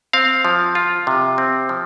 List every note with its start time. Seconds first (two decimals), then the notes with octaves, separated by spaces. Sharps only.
0.13 C4 F5
0.45 F3
0.75 F4
1.07 C3
1.38 C4
1.69 F3